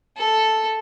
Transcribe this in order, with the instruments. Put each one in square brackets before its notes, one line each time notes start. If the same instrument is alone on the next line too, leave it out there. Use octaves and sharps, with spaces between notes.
[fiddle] A4